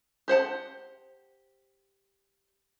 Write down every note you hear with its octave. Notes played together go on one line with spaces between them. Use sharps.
G4 C5 F#5 A5